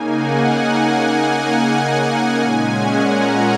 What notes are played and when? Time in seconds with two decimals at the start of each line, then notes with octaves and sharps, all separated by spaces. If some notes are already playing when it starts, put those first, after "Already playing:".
Already playing: C#3 A#3 D#4 G#5
0.10 F#5
0.43 G#5
0.76 G#5
1.08 G#5
2.40 A#2 G#3 C#4 G#5
2.73 F#5
3.06 A#5